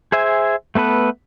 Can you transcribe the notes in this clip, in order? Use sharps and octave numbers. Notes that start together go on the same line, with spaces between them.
G#4 C5 E5 G#5
A3 B3 A4 B4